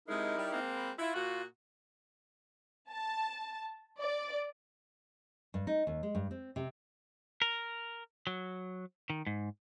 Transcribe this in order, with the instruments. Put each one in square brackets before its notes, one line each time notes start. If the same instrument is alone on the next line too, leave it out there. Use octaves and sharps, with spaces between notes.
[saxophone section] C3 G#3 [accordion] D#4 E4 A#4
[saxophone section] G3
G#3 A#3 C4
[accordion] B5
[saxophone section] E4 [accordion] F4
[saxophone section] A#2 F#4
[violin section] A5
D5
[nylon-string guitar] G2
D#4
D#2
G#3
G2
C4
C3
[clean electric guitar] A#4
F#3
D#3
G#2